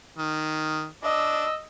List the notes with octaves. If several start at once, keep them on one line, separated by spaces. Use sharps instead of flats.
D#3
D4 D#5 E6